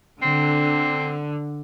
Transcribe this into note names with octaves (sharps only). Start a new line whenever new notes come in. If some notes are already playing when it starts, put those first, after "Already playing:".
D3 C4